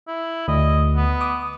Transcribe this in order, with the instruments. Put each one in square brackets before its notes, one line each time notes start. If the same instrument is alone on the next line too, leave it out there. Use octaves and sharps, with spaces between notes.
[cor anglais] E4
[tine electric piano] D2 [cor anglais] D#5
[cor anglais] B3
[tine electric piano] D6 D#6